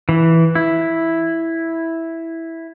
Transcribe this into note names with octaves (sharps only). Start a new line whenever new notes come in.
E3
E4